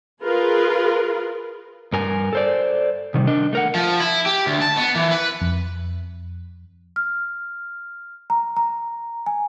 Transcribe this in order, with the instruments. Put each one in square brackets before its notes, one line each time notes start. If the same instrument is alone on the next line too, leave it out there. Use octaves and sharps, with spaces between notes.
[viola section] F4 G#4 A#4 B4
[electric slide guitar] G2 A#4 G#5
A4 C5 D5
C3 D#3 G3
D4 A#4 D#5
A3 A#4 F#5
[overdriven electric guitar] F3
E4
G4
D2
A5
B3
E3
B4
[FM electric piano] F2
[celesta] F6
A#5
A#5
G#5